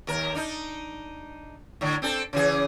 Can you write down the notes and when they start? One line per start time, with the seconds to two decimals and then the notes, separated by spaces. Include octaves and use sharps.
0.07 D#2 A#4
0.34 D4 D#4
1.81 A2 D3
2.02 C4 D4 A4
2.33 C#3 E3 G#4